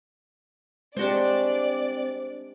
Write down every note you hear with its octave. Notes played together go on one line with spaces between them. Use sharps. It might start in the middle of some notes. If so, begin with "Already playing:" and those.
G#3 C4 D4 F#4 G4 C5 D5